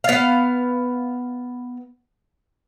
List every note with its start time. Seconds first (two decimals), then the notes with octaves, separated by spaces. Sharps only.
0.04 B3 F5